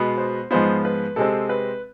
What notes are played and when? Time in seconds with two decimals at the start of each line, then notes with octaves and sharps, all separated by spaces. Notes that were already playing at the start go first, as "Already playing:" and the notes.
Already playing: B2 G#3 B3
0.18 C5
0.51 G#2 F3 G#3 B3 C5
0.85 B4
1.16 C3 G#3 C4 A4
1.49 B4